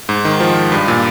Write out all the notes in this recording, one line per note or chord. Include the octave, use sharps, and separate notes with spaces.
G#2
D#3
F3
G2
A#2